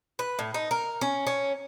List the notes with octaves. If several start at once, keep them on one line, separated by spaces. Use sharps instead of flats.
B4
A2
D#4
A#4
C#4
C#4